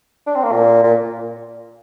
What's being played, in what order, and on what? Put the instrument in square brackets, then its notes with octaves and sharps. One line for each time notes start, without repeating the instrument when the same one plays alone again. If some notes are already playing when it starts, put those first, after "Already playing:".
[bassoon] D4
C4
A#3
A#2
A#2